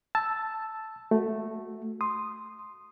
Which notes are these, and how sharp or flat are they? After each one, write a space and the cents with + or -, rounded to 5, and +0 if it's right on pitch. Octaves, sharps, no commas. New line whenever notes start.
A5 +0 E6 +0
A3 +0 F#4 -5
C6 +0 D#6 -5